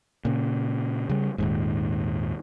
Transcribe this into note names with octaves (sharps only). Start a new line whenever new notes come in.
A#2 C#3
C#3 G3
D#1 D#2 G#2